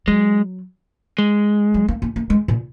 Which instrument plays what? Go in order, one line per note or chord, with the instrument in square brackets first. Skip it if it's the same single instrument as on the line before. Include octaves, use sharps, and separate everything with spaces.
[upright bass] F#3 [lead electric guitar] G#3
[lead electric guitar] G#3
[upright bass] F#3
A#3
A#3
A#3
G#3
A#2